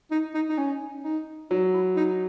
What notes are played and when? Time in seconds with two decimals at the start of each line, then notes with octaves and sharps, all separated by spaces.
0.11 D#4
0.34 D#4
0.49 D#4
0.58 C#4
1.04 D#4
1.50 F#3 D#4
1.73 E4
1.97 D#4